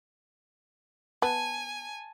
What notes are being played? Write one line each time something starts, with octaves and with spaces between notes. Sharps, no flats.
B3 G#5 A5